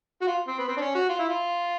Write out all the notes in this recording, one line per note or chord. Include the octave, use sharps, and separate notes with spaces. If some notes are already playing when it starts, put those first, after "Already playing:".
F#4
F4
C4
B3
C4
D4
C#4
F#4
F4
E4
F4